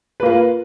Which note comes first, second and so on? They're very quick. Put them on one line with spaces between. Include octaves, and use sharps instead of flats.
B4 A#3 F4